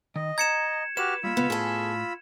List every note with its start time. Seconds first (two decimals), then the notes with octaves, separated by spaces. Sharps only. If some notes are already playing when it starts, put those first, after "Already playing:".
0.16 D#3 D#5
0.38 A#5 G#6 C#7 E7
0.97 F#4 G4 B4 F6 E7
1.24 G3 A#3 F4 B5 E6
1.37 C#2 B3
1.50 A2 G#4 A4